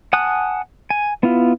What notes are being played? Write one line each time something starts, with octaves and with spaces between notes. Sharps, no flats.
F#5 G#5 A5 D#6 F#6
G#5
B3 E4 F4